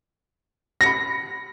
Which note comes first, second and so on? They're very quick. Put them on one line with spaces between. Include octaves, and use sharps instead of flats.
A#6 C#7 B5